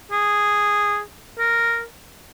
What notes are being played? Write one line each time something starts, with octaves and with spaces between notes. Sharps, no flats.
G#4
A#4